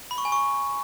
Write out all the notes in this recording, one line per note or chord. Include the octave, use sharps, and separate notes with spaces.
B5
C#6
G#5
C#6